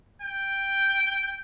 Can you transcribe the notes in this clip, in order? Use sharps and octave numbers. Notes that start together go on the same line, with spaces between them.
G5